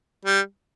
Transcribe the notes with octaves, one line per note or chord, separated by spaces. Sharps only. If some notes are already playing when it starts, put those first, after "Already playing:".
G3